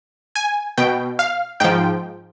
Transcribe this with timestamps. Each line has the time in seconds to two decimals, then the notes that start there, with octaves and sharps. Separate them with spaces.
0.36 G#5
0.78 B2 G5
1.19 F5
1.60 G#2 F3 G5